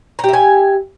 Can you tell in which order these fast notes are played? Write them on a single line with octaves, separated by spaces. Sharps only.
A#5 G4 E5 G#5